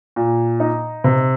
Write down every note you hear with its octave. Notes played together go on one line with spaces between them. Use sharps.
A#2
D#4
C3